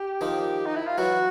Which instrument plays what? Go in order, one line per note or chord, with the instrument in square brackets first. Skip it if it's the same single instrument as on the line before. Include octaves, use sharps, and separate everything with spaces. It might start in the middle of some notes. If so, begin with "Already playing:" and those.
Already playing: [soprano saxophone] G4
[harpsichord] D#3 F3
[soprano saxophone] D#4
E4
F4
[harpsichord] E3 F#3 [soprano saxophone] F#4